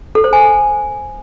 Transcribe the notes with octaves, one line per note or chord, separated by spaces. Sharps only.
A4
C5
G#5